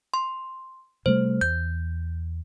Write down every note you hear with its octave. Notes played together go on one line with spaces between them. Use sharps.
C6
C3 G3 A3 C5
E2 G6